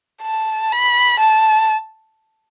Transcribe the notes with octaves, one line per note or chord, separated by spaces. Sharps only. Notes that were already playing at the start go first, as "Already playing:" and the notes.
A5
B5
A5